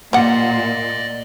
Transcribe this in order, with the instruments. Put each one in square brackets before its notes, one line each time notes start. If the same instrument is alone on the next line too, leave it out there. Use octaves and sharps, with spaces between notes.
[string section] A#2 [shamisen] G3 F#5 [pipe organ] D5 D#5